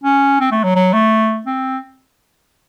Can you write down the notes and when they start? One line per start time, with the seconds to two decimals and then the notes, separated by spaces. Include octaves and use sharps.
0.04 C#4
0.41 C4
0.52 A3
0.64 F#3
0.76 F#3
0.94 A3
1.47 C4